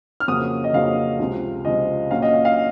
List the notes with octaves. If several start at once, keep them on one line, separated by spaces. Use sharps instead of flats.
F6
F2 C#3 F#3 A#3 C#4 D#6
D#5
F2 C#3 F#3 A#3 C#4 F5
C#2 C3 F3
C#2 C3 F3 D#5
A#2 F#3 C#4 F5
D#5
F5
F5